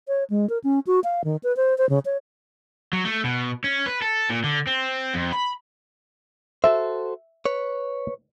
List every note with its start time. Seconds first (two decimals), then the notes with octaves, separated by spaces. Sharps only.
0.08 C#5
0.30 G#3
0.50 A#4
0.64 C#4
0.87 F#4
1.04 F5
1.24 D#3
1.43 B4
1.57 C5
1.78 C5
1.89 C#3
2.05 C#5
2.93 F#3
3.05 A3
3.24 B2
3.64 C#4
3.86 B4
4.02 A4
4.30 A#2
4.44 D3
4.67 C4
5.14 F2
5.32 B5
6.64 F#4 A4 C5 E5
7.46 B4 C#5